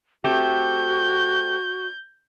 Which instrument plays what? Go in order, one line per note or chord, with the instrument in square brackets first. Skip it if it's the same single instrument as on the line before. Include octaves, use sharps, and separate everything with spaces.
[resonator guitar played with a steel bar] A3 C4 G4 [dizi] F#4 [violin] G6